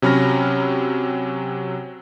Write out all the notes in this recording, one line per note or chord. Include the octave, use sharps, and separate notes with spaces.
C3 F#3 C#4 B5 F6 A#6